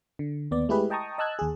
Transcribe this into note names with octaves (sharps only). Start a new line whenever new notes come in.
D3
D#2 B3 D5
G#3 A3 E4 G4 G#4 B4
D#5 G5 A5 A#5 C#6 D#6
D#5 A5 E6 F#6 G#6
D#2 G#4